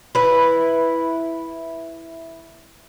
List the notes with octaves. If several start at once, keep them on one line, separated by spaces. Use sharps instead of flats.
E4 B4